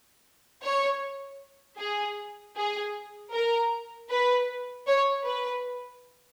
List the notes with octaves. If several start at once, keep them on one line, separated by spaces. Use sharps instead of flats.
C#5
G#4
G#4
A#4
B4
C#5
B4